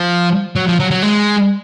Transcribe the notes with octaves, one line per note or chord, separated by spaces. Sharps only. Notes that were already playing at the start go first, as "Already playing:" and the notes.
Already playing: F3
F#3
F3
F#3
F#3
G#3